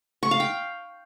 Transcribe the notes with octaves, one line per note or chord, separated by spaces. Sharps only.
C#6
F5
G5